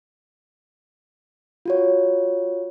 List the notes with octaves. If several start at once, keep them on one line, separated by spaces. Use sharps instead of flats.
F4 F#4 C#5